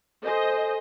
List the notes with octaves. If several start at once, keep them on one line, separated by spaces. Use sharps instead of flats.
A4 C5 D#5 G#5